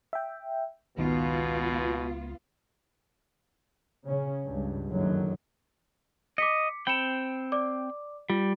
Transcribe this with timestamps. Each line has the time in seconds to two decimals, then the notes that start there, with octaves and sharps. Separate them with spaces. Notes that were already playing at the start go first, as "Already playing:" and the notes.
0.13 E5 G5
0.98 G#1 C#2 B2 D#3 B3 F4
4.05 C#3 C#4
4.46 C#2 G2
4.90 F#1 F#2 D3 D#3 F#3
6.38 D#5 D6 B6 C#7
6.87 C4 G5 B5 C#7 E7
7.52 D5 D6
8.30 G3 F4